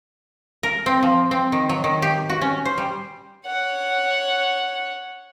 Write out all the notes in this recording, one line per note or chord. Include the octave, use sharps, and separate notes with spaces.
A#4
C4
F3
C4
D#3
F#3
D#3
G4
F#4
C#4
C5
G3
C#5 F#5